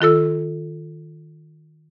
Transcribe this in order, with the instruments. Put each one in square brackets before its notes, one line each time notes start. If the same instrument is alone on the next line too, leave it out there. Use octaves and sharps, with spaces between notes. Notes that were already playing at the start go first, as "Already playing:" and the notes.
[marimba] D#3 F4 A4 E6